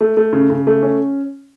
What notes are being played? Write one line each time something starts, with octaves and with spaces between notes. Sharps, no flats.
A3
A3
C#3
C#3
A3
C#4